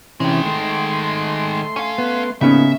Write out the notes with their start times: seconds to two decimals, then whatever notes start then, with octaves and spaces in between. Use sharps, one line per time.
0.20 C3 D#3 E3 G#3 C#4
0.46 A3 C6
1.76 C#4 F5 G#5
1.98 B3
2.41 C#3 A#3 B3 C#4 D#4 E5